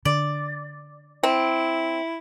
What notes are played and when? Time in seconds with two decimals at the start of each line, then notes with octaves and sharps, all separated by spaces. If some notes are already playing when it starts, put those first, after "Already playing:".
0.05 D3 D5
1.23 C4 E4